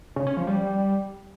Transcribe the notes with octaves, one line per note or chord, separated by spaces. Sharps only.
C#3
C#4
F3
G3